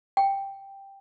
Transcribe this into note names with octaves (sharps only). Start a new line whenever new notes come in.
G5